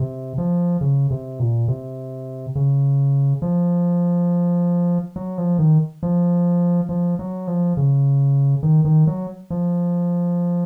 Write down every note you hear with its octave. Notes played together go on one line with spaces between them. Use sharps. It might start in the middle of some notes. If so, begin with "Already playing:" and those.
Already playing: C3
F3
C#3
C3
A#2
C3
C#3
F3
F#3
F3
D#3
F3
F3
F#3
F3
C#3
D#3
D#3
F#3
F3